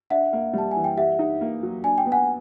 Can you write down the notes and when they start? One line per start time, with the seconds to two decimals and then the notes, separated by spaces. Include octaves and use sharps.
0.10 D4 E5 F#5
0.33 A#3
0.53 G3 A5
0.71 E3 G#5
0.84 G5
0.97 G4 E5 F#5
1.19 D#4
1.41 A#3
1.63 F#3
1.84 D4 G#5
1.98 G5
2.06 B3
2.12 F#5 G#5